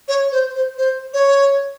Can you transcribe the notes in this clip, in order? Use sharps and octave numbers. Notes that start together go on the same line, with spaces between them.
C#5
C5
C5
C5
C#5